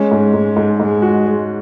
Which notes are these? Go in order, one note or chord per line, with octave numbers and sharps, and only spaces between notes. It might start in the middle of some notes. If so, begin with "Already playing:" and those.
Already playing: G#3 C#4
G#2
G#2
G#2
G#2 G#3
F#4